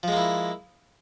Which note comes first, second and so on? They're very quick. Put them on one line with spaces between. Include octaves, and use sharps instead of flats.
F3 G#3 A#3 E4